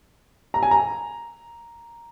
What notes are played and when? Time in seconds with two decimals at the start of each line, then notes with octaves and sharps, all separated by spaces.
0.54 A#5
0.63 G#5
0.71 A#5